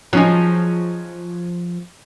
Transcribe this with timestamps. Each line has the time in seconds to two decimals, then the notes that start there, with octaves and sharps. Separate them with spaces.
0.13 F3 F#3 C#4 D#4 G#4